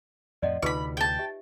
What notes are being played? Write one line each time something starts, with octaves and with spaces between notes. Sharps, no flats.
F2 A2 F3 D5 D#5 F#5
D2 C3 D#4 F4 B4 B5 C#6
G5 A5
G4 E5